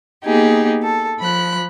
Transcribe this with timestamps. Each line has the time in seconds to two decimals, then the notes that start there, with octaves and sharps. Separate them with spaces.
0.25 A#3 B3 D#4 G4 G#4
0.83 A4
1.19 F3 B5 F#6